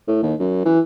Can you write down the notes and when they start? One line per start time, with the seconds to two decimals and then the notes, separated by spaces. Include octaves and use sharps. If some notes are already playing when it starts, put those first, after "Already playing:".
0.08 A2
0.23 D#2
0.40 F#2
0.65 E3